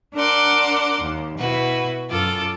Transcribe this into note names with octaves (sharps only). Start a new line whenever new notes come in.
D4 A#4 F#5 C6 D6
D#2
B2 E4 F#4 B4
F#2 F4 A4 D6